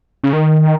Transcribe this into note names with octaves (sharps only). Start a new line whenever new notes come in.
C#3
D#3